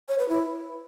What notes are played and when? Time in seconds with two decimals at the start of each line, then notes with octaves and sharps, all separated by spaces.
0.09 C#5
0.19 B4
0.29 E4